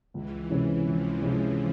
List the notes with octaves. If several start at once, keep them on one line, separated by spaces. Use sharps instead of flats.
C#2 E3
C3 E3 G#3 C#4
C#2 F3
C3 E3 G#3 C#4